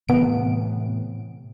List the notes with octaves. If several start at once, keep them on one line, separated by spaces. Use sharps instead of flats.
A2 C3 E3 B3 D7